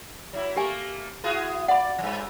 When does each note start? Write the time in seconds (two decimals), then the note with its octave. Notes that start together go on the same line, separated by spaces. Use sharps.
0.33 F#3 E4
0.56 A3 A#3 G4 G#5
1.24 E4 F#4 G#4
1.68 D5 F#5 B5
1.98 G2 F3